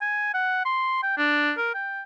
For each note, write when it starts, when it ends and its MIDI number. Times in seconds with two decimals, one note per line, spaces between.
0.01 0.34 80
0.34 0.61 78
0.65 0.99 84
1.03 1.15 79
1.18 1.52 62
1.58 1.72 70
1.74 2.03 79